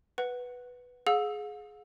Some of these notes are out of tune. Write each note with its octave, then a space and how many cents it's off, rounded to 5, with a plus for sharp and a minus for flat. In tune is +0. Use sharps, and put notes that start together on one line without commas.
B4 +0 F#5 +0
G#4 +15 F5 +45 E6 +0